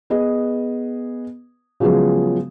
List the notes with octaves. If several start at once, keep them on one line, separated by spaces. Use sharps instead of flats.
B3 G#4 B4 D#5
C#3 F3 F#3 G#3 B3 G#4